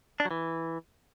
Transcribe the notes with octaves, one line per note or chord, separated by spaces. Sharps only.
D4
F#3
E3